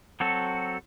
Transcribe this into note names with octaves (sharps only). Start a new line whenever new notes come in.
F#3 C4 F#4 A4